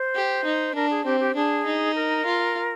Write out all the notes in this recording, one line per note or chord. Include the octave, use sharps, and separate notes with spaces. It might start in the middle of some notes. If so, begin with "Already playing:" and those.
Already playing: C5
G4
D#4
D4 A#4
G#4
C4 G4
G4
D4 G#4
D#4
A#4
F4